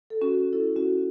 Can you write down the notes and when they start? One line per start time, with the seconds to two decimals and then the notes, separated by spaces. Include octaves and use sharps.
0.10 A4
0.22 C#4 F#4
0.53 E4 A4
0.76 C#4 F#4